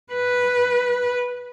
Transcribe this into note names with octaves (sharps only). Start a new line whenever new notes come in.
B4